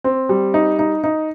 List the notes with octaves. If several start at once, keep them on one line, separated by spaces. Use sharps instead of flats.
C4
G3
D#4
D#4
D#4